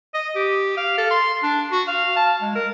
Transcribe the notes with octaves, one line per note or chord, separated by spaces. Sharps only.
D#5
G4
F5
A4
C6
D4
F#4
F5
A5
G#3
A#4